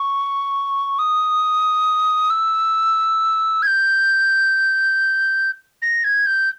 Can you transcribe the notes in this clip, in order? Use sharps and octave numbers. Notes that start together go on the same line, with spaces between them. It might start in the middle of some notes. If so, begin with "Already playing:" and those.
Already playing: C#6
D#6
E6
G#6
G6
A#6
G#6
G6